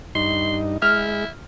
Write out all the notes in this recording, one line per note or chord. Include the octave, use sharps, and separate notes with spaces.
G2 D#4 C6
G#3 E4 F6